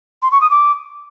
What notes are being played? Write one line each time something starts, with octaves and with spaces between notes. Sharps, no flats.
C6
C#6
D#6
D6